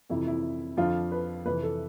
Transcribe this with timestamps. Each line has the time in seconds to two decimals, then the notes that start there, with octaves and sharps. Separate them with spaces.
0.10 F2 C3 E3 E4
0.27 E4
0.77 F2 D3 F3 F4
1.12 B4
1.45 F2 C3 E3 B4
1.63 A4